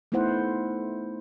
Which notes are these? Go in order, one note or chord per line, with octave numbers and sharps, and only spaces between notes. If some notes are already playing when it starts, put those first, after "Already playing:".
A3 B3 D#4 E4 C5 F#5